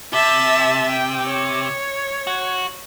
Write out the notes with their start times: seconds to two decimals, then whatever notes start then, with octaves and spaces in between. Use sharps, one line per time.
0.13 C3 E5 A5
0.90 G5
1.26 C#5
2.27 F#4